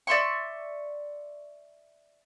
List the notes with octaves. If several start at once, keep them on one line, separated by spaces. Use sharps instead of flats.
D5 E5 C6 C#6